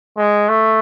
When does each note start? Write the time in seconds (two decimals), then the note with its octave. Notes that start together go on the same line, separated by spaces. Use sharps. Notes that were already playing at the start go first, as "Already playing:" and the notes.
0.17 G#3
0.49 A3